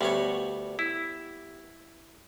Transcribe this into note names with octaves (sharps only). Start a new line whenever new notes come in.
D2 G3 B3 C#5
E4